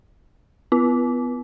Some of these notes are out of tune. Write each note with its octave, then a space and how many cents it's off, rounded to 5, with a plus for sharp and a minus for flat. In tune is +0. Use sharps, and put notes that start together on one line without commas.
B3 +20 F4 -45